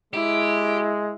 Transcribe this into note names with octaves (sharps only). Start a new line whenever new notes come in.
G#3 E4 G4